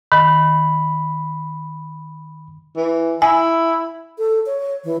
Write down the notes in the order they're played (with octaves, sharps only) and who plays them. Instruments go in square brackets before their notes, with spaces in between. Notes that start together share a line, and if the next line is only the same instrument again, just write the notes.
[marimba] D#3 [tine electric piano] B5
[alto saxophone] E3
[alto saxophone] E4 [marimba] G#5
[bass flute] A4
C#5
E3